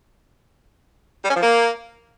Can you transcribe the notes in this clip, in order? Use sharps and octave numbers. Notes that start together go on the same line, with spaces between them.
G3
C#4
F3
A#3